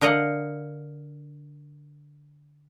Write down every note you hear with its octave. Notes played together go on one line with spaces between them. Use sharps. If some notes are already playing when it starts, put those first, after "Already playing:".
D3 A#4 D#5 F5 F#5